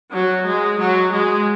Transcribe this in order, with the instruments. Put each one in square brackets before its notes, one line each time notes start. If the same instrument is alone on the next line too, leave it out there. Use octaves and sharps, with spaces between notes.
[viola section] F#3
G#3
F#3
G#3